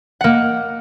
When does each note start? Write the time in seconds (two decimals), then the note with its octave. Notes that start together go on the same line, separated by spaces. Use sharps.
0.21 A#3 F#5